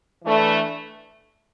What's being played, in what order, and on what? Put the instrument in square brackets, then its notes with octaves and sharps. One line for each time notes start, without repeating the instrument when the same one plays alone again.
[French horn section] E3 A3 D4